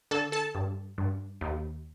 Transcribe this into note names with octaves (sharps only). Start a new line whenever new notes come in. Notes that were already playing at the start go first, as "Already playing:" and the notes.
D3 A4 A5
A4 A5
G2
G2
D#2